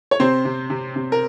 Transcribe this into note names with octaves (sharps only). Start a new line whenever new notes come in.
C#5
C3 C4 C5
C3
C3
C3
A#4